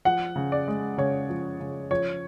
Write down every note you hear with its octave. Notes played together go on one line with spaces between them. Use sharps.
F3 F#5
C#3
D5
G#3
C#3 C#5
F3
C#3
F3 C#5